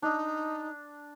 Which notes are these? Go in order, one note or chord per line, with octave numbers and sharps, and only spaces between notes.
D4 D#4